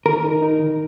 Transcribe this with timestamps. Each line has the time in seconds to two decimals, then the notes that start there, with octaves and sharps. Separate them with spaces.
0.06 D#3 A#4
0.24 D#4
0.42 D#4
0.60 D#3